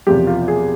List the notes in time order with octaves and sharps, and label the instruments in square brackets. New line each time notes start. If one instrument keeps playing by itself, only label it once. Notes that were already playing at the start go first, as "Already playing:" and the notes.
[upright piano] E1 E2 C3 F3 G4
F4
G#4